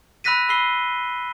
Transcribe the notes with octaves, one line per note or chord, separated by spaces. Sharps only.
B5 E6 F#6 A#6 B6 D#7
B5 E6 C7 G7